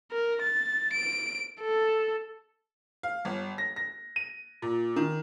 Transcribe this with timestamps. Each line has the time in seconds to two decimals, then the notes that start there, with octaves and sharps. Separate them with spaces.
0.12 A#4
0.42 A6
0.93 D7
1.61 A4
3.03 F5
3.25 G1
3.58 A#6
3.76 A#6
4.16 D#7
4.62 A#2
4.96 D#3